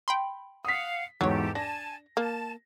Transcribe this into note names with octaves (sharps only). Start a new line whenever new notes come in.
G5 B5 C6
F5 F#5 D#6 B6
E2 G#2 F#3 G4 A4 C#5
D4 G#5 A5 A#6
A#3 A5